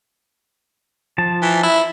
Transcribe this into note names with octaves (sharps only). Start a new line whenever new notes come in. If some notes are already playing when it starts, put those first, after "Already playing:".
F3 A5
E3
E4